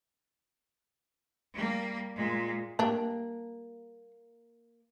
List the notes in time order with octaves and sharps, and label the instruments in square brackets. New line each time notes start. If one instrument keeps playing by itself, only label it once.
[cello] G3 A#3
A#2 G#3
[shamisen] G3 D4 [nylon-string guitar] A#3